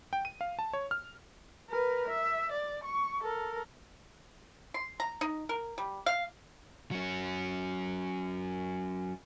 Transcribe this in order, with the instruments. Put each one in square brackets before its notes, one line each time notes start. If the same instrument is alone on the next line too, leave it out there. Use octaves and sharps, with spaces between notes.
[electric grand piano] G5
D#7
F5
A5
C#5
F6
[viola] A#4 B4
E5
D5
C#6
A4 A#4
[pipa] C6
A#5
D#4
A#4
G3
F5
[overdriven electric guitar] F#3 C#4